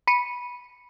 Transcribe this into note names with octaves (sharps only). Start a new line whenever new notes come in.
B5 C#7 D#7